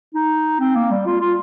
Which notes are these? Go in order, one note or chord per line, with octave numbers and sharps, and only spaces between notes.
D#4
C4
A#3
G3
F4
F4